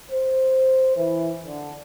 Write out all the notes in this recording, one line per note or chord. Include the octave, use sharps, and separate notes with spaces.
C5
E3
D3